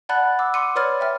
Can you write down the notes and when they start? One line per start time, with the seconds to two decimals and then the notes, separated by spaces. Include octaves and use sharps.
0.09 D5 F#5 A5 B5 F#6 A6
0.39 D6 E6
0.54 C6 D6 C#7 D#7
0.75 B4 C#5 D5 B5 F6 A6
1.00 E5 G5 F6